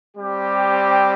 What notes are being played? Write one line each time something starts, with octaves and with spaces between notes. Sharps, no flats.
G3 C4 G4